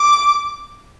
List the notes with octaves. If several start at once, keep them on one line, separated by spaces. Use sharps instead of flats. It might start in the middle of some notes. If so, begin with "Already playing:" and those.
Already playing: D6